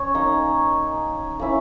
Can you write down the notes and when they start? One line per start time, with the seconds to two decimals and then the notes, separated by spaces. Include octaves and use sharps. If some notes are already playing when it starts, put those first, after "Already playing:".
Already playing: C#4 C#5
0.14 A#3 D#4
1.39 A#3 C#4 E4